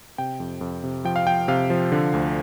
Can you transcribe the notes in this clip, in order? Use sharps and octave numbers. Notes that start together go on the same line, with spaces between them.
C3 G5
F2
F2
C3
F3 G5
F5
F3 G5
C3 F5
F3
D3
D2